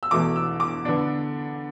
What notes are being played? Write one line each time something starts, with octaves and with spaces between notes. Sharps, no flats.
E6
E2 B2 A3 D6
E6
D6
D3 B3 D4